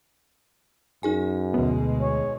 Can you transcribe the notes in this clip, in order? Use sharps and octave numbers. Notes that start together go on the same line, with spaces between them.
F#2 D#4 G#4 G#5
D2 B2 G#3 B3
C#5